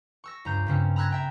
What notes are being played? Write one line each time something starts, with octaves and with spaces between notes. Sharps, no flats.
C#6 E6 A#6
C#2 G2 A#5 G6
G2 C#3 C4 C#4
A#5 B5 E6 F#6 G#6 A#6
E5 G5 A#5